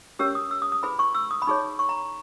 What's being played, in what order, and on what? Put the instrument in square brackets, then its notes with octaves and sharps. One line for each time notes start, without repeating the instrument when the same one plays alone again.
[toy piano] C#4 G4 A#4 C#5 E6
D#6
E6
D#6
D#6
E4 G#4 B4 B5
C#6
E6
D#6
B5
D#4 G#4 C#5 C#6
C#6
A#5